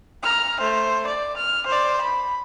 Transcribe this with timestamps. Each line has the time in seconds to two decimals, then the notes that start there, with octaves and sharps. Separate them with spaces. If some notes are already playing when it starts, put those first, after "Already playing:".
0.23 A#5 F6
0.60 A3 C5
1.07 D5
1.37 F6
1.67 C5 D5
2.02 B5